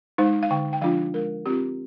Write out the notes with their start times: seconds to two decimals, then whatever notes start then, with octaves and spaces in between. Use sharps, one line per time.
0.18 G#3 D#4 C5
0.43 F5
0.51 D3 G5
0.73 G5
0.82 F3 G#3 D4 F4 F5
1.14 G#3 A#4
1.46 C4 F4 G4